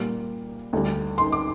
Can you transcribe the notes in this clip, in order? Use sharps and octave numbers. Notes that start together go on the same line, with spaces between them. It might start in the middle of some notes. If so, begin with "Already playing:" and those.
Already playing: A#2 G3 A#3 C6
D2 D3 G3
C6
D6